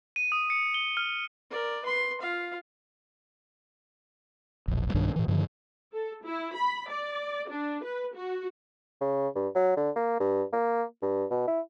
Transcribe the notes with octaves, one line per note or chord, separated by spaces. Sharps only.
D#7
D#6
C#7
G7
F6
A#4 D5
B4 C6
F4 F5
E1 A#1
B1 G2 D#3 D4
A2 E3
G2 D3 D#3 F3
A4
E4
B5
D5
D4
B4
F#4
C#3
G2
F#3
D3
A#3
G2
A#3
G2
B2
E4